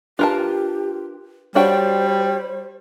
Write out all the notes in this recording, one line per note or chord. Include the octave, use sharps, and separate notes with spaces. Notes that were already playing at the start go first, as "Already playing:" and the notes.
D4 F4 G4 A#4 B4 A5 F#6
G3 D4 F#4 C5 C#5 F5 G5